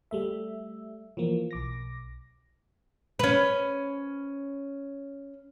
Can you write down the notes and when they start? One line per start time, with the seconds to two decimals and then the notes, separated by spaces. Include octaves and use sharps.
0.11 G3 A3 E5
1.17 E3 F3 A#3
1.51 B1 D6 A#6
3.19 C#4 B4